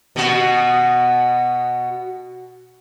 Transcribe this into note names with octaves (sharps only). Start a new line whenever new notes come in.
B2 B3 F#4